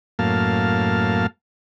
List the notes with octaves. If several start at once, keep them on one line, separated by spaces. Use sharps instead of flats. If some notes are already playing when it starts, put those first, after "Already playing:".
F#2 A2 A#3 F5 A5